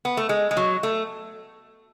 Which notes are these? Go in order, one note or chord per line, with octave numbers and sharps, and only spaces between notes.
B3
A3
G#3
G#3
F#3
A3